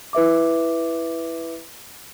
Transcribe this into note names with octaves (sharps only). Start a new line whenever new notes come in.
E4 B4 E5 D6